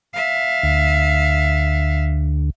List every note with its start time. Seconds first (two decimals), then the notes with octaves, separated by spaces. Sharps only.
0.14 E5 F5
0.63 D2